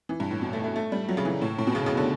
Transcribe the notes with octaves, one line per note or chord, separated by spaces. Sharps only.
E3
G2
A2
B2
A3
A3
A3
G3
F#3
C#3
E3
A2
A2
B2
C#3
C#3
D3